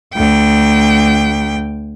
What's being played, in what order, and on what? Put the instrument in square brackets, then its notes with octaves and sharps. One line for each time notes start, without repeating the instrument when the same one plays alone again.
[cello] D2 G5